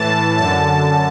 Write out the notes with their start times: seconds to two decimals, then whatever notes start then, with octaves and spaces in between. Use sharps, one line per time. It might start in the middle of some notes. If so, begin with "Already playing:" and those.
Already playing: A2 E3 A5
0.37 F#2 D3 A5